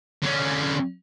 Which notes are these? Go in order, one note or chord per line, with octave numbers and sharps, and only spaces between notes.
D3 C#4